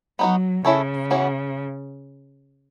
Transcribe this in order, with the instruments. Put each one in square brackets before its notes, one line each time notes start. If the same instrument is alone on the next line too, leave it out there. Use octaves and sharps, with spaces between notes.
[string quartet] F#3 [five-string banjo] B3 D#4 F#4
[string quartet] C#3 [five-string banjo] C#4 E4 A4 C#5
[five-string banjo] E3 B3 F#4 C#5